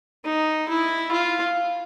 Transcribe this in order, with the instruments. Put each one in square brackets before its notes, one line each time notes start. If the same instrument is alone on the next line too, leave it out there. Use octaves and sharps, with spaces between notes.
[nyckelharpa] D#4
E4
F4